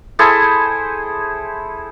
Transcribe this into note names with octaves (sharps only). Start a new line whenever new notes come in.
E4 G#4 A4 C5